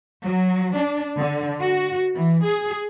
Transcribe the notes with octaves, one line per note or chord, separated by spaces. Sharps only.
F#3
D4
D3
F#4
E3
G#4